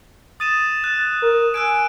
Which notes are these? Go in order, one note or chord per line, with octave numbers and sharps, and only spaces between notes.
D#6 A6 D#7 E7
F#6
A#4
G#5 E6 F#6 D7